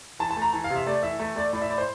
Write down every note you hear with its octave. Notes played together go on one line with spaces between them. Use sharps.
E3 A5
A5
A3
A#5
E3 A5
F5
C3
E5
A3 D5
E3 E5
A3 E5
A3 D5
A2 D5
E5
A2 D5
C5